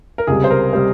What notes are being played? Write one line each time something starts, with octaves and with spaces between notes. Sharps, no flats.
A#4
C#2 C3 G3 G#4
C5
A#4
C3 G3 C5